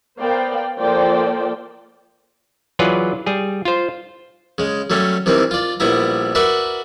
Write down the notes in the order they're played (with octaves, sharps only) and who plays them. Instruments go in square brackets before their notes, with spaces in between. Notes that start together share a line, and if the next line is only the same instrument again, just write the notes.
[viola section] B3 A#4 C5 D5 F5 G5
F3 A#3 A4 C5 D5 G5
[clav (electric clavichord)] E3 F#3 F4 G#4 B4 D5
G3 G#4
F4 C5
[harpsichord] C#3 G#3
F#3 G3 A3 C#4 G4
C3 D#3 E3 G3 C4
F4 D5
A#1 G3 B3 E4 A#5
F#4 A#4 B4 D5 E5